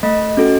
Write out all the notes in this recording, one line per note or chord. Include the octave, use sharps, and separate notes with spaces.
A3 D#5
C#4 F#4 A4